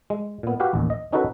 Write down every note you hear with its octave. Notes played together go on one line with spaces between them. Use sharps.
G#3
A#2 B3
F#4 G4 B4 F5 F#5
A1 D#2
D#5
C#4 D#4 F#4 A4 B4